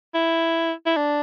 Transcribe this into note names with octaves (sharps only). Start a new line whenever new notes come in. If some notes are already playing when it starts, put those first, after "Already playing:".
E4
E4
D4